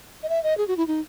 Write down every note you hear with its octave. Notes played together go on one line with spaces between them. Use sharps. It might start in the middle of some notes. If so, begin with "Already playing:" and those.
D#5
E5
D#5
G#4
F#4
E4
D#4